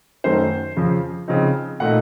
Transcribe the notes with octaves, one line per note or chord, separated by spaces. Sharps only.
F#2 D#3 A3 C#4 C5
F2 C#3 F3
C#3 F3 C4 D#4
A#2 A3 D#4 F#5